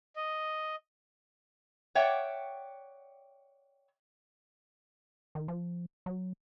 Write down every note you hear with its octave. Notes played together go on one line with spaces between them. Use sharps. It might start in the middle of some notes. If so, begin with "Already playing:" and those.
D#5
C#5 D5 E5 F#5 G5
D#3
F3
F#3